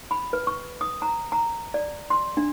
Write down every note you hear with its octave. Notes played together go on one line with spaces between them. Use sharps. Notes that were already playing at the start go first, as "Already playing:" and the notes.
B5
B4
C#6
D#6
A#5
A#5
D5
C6
D4